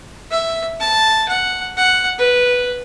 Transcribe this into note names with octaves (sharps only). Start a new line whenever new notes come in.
E5
A5
F#5
F#5
B4